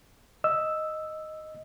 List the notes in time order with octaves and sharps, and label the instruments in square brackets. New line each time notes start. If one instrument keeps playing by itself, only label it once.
[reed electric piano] D#5 E6